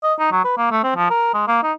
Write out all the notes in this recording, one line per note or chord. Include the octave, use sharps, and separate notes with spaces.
D#5
D#4
F#3
B4
A#3
A3
C4
F3
A#4
G#3
A#3
D#4